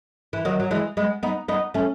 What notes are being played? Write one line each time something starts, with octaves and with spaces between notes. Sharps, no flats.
E3
D#3 F#3
F#3
E3 G#3
G#3 B3
B3 D#4
B3 D#4
A3 C#4